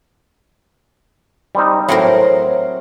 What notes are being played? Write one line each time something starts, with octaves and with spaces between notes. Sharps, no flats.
G3 C4 D#4
A2 F#3 C4 A#4